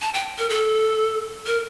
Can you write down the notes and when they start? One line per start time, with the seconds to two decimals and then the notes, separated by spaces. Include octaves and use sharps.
0.02 A5
0.14 G5
0.38 A#4
0.49 A4
1.47 A#4